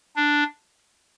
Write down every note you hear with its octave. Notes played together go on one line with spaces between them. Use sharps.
D4